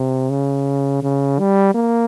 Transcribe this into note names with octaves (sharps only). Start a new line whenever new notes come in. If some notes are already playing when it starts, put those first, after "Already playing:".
Already playing: C3
C#3
C#3
G3
A#3